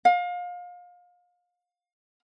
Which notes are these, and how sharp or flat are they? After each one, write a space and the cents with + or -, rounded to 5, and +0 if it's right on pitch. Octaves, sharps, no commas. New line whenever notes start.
F5 +30